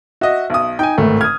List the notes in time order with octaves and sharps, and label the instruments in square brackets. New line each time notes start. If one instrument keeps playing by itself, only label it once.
[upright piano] F#4 D#5 [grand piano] E5
[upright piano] B1 D#6
[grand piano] D#4 [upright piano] G5 G#5
[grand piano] G#1 A2 [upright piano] A3
[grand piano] D#6 F6 [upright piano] G#6